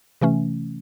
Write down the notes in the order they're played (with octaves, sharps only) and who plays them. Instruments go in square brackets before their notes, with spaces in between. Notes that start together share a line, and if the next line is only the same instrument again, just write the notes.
[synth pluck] C3 E3 A3 C#4